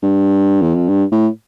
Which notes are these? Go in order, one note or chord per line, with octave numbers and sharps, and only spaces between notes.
G2
E2
F2
G2
A2